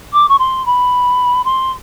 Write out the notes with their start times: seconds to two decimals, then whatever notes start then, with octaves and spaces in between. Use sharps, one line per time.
0.13 D6
0.28 C#6
0.39 C6
0.65 B5
1.44 C6